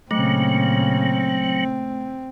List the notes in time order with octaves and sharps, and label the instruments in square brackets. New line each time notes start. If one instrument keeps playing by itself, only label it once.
[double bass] A#2 C#3 [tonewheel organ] F#3 [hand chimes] A3 [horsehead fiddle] C4